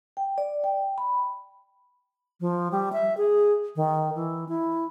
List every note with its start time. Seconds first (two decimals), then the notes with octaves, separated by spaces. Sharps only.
0.17 G5
0.38 D5
0.64 G5
0.98 B5
2.41 F3
2.72 G3
2.93 E5
3.17 G#4
3.76 D#3
4.15 E3
4.49 E4